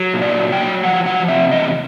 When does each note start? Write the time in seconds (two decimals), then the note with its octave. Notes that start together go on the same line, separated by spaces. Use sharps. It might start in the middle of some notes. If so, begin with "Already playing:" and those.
Already playing: F#3
0.14 A#2
0.22 D5
0.38 F#3
0.52 G5
0.61 F#3
0.83 F3 F#5
1.06 F3 F#5
1.28 C3 E5
1.51 E2 D#5